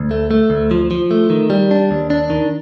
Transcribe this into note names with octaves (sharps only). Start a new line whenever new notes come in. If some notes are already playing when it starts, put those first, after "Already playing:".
Already playing: D2
A3
A3
D2
F3
F3
A3
D#3
G3
D4
D#2
D4
D#3